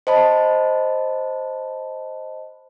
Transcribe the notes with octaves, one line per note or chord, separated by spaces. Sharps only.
C5 D#5 A5 B5